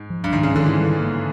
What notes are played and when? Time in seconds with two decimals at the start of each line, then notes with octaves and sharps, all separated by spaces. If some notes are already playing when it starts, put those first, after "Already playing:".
Already playing: G#2
0.10 F3
0.24 G2
0.33 G#2 D#3
0.43 C#3
0.55 D3 D#3
0.66 E3
0.77 G3
1.00 A#3